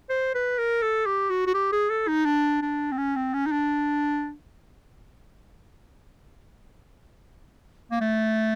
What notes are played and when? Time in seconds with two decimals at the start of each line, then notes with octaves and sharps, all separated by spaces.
0.09 C5
0.35 B4
0.58 A#4
0.82 A4
1.06 G4
1.30 F#4
1.47 F#4
1.54 G4
1.72 G#4
1.90 A4
2.08 D#4
2.25 D4
2.62 D4
2.92 C4
2.98 C#4
3.16 C4
3.34 C#4
3.46 D#4
3.52 D4
7.91 A#3
8.01 A3